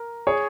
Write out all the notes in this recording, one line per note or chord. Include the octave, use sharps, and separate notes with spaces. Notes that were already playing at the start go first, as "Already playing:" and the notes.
Already playing: A#4
G#4 C#5